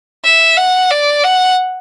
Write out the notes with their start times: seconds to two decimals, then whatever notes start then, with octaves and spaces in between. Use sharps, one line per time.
0.24 E5
0.57 F#5
0.91 D5
1.24 F#5